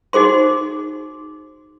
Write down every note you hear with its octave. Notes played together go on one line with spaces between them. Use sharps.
D#4 F#4 G#4 C5 C6